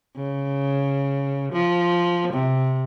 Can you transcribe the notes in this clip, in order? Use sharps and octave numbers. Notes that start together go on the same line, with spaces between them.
C#3
F3
C3